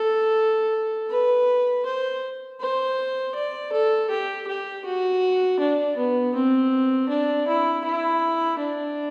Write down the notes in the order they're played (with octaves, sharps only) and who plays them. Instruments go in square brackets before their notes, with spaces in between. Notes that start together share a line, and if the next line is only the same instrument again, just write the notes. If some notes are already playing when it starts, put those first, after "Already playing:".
Already playing: [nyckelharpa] A4
B4
C5
C5
D5
A4
G4
G4
F#4
D4
B3
C4
D4
E4
E4
D4